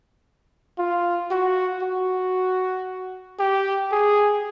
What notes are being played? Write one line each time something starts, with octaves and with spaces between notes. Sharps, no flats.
F4
F#4
F#4
G4
G#4